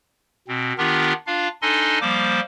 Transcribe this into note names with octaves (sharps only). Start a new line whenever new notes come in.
B2 C4
D#3 B3 D4 F4 G4 A#4
D4 F4 F5
D4 D#4 A4 D#5 G#5 C6
F3 G3 A#3 C5 D6